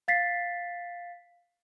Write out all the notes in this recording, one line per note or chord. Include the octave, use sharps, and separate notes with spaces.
F5 A6 B6 C7